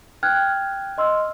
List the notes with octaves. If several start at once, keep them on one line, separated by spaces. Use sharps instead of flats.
G5 F6 F#6 G#6
D#5 C6 E6 F6